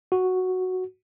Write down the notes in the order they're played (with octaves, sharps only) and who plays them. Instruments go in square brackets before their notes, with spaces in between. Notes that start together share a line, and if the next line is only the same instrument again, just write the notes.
[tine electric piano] F#4